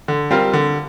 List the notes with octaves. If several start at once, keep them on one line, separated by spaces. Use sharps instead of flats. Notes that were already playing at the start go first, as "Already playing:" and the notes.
D3
G3 C4 F4 A#4
D3